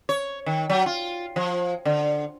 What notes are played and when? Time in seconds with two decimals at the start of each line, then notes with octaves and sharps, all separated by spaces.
0.09 C#5
0.46 D#3
0.70 F#3
0.86 F4
1.36 F3
1.85 D3